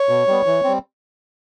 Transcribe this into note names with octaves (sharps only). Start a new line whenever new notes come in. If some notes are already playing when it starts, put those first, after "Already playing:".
Already playing: C#5
B2
G3 B3
E3
G3 C4